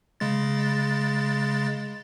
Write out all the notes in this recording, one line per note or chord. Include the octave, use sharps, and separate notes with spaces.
C#3 G#3 A6